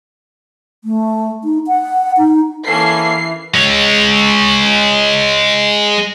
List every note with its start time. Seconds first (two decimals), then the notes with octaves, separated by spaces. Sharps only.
0.84 A3
1.44 D#4
1.67 F#5
2.17 D#4
2.67 E3 A#3 C#4 A4 C7
3.54 G#3 C#5